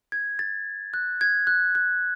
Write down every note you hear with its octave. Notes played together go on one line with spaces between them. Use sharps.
G#6
A6
F#6
G#6
F#6
F#6